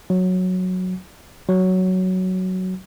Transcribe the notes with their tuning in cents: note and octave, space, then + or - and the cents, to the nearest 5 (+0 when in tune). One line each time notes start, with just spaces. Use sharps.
F#3 -10
F#3 +5